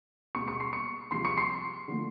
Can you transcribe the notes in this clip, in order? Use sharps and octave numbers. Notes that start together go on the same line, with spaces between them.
B2 G#3 C#6 C#7
C#6 C#7
C6 C7
C#6 C#7
C3 F3 G#3 C6 C7
C#6 C#7
C6 C7
D3 F3 A3